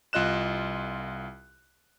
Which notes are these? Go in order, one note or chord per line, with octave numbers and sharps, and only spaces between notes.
C2 F4 D#5 F#6 E7